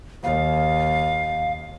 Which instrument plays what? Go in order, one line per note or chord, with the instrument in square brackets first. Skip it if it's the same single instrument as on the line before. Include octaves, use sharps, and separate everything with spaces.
[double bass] D#2 [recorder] F5